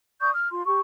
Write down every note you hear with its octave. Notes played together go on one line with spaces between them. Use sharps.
D5 C#6 D#6 G6
F6
F4 C6
G4 C#6